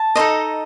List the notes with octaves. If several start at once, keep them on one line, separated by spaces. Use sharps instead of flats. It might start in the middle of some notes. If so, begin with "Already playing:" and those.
Already playing: A5
D#4 A4 C5 D#5